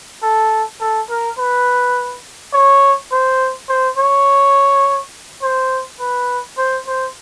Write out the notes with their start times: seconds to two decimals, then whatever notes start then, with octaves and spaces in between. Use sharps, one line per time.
0.23 A4
0.80 A4
1.10 A#4
1.38 B4
2.53 C#5
3.12 C5
3.69 C5
3.97 C#5
5.42 C5
5.99 B4
6.58 C5
6.87 C5